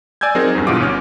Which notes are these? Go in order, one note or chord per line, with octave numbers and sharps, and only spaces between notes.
D5 G#5 E6 G6 G#6
F#3 C4 D#4 G#4 A#4
E2 G2
G2 B2 E3 F4 D6
G1 C#4 F6